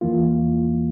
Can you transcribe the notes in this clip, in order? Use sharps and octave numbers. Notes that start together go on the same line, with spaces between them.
E2 E3 A#3 F4